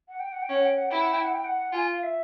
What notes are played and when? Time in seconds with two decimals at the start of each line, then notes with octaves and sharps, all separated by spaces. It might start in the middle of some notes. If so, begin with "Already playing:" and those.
0.08 F#5
0.20 G5
0.32 F#5
0.42 G5
0.49 C#4
0.54 F#5
0.65 G5
0.76 F#5
0.88 E4 G5
0.99 F#5
1.11 G5
1.22 F#5
1.33 G5
1.44 F#5
1.73 F4 G#5
1.92 F5
2.03 E5